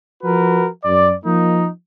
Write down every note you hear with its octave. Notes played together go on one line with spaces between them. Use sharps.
F3 F#4 A#4 B4
F#2 D5
F3 A#3 D#4